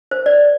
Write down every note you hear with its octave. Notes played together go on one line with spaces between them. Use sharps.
C5
D5